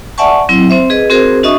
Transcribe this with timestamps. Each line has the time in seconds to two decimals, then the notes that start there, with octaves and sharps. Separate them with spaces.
0.18 D5 E5 F#5 G#5 A5 C#6
0.49 F#3 C4 E4
0.70 C4 C5 E5
0.90 G#4 B4 D#5
1.10 C4 F#4 G#4 A#4 C5
1.43 D4 F#4 D#5 E5 C#6 D#6